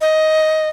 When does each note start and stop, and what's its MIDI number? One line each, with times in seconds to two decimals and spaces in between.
0.01 0.69 75